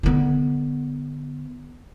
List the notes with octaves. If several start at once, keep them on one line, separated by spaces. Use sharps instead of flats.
D3 B3